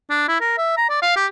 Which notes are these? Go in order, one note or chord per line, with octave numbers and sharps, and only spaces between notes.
D4
E4
A#4
E5
A#5
D5
F5
G4